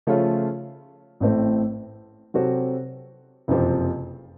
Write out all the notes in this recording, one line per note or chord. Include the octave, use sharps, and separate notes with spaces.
C#3 F3 A3 C#4 F4
A1 A2 A3 C4
C3 F#3 C4 F#4 A4
F#1 F2 C3 F3 C4